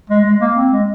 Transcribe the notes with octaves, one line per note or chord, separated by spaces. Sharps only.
G#3
G#3
A#3
C4
G#3